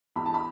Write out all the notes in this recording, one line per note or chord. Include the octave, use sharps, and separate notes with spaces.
E2 B5
A5
B5